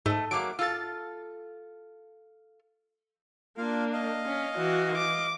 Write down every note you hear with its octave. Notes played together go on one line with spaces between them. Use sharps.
G#2 A3 D#5
F#3 G#3 A#3 D6 D7
F4 A4 E6 A6
A#3 D4 F4 F5
D#5 F5
C#4
E3 F#4
D6